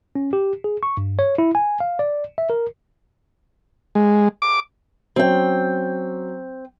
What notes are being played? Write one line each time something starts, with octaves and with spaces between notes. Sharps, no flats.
C#4
G4
G#4
C#6
G2
C#5
E4
G#5
F5
D5
E5
A#4
G#3
D6
F#3 C4 C#4 G5